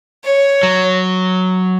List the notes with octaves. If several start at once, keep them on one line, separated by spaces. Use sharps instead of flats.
C#5
F#3